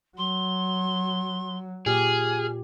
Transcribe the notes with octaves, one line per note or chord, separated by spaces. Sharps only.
F#3 C6
A#2 G4 G#4 F6